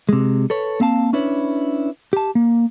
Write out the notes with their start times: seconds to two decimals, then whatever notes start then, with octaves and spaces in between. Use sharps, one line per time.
0.09 C3 G#3
0.50 A4 B4 C#5
0.80 A#3 C4 F5 A5
1.13 C#4 D4 E4 B4 C#5
2.13 G4 A5
2.35 A#3